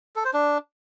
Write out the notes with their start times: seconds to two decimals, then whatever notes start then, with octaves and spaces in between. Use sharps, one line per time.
0.16 A4
0.25 C5
0.34 D4